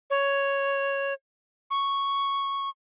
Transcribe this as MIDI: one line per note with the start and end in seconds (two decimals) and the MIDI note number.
0.10 1.13 73
1.71 2.70 85